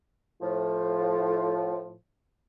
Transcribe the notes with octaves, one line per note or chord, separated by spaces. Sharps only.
A2 F3